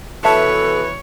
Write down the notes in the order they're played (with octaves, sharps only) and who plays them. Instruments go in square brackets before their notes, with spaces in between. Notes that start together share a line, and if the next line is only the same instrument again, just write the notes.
[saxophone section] B2 E3 B4 [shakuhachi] A4 [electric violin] C#5 [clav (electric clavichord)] E5 A5